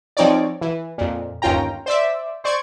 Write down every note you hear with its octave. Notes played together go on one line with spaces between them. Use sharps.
F3 C4 D#4 C#5 D5
E3
F2 A#2
G1 D#2 C#4 F4 G5 A#5
C5 D5 E5
C5 D5 C#6 G#6